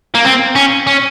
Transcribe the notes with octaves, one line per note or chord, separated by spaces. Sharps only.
A#3
C4
C#4
C#4